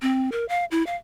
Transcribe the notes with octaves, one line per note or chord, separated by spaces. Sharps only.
C4
A#4
F5
E4
F5